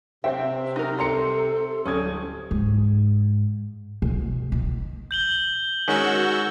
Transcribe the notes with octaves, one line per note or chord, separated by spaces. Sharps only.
C3 C4 C5 E5 G5
D#4 F#4 A#4
G3 A4 A#5 C6 C#7
D1 G3 C#4 D#6 G#6
G#2
B2
D#3
G6 F#7 G7
D#3 G#3 C#4 F#4 C#6 E6